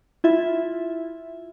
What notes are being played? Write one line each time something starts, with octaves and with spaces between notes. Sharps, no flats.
E4 F4 E5